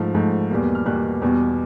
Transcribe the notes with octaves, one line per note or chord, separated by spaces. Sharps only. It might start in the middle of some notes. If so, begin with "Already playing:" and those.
Already playing: G#2 F3 A3
G#2 F3 A3
E2 B2 G3 A#3
F6
E2 B2 G3 A#3 F#6
E2 B2 G3